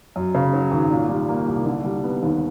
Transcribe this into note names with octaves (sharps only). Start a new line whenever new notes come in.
F#2
C#3
F#3
G#1
A#2
G3
A#3
C2
D3
G3
B3
D#2